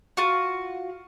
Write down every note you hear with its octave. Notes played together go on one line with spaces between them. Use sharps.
F4 F#4